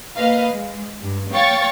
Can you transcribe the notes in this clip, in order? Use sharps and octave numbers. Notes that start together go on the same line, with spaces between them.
A#3 B4 D#5 F5
G#3
G2
C#5 F5 G5 C#6 A6